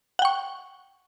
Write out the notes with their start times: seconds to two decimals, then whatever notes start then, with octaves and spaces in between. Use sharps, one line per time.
0.19 F#5
0.22 G5
0.25 C#6